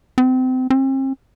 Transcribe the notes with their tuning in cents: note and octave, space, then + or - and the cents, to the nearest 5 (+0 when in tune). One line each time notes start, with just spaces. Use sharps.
C4 -30
C4 +40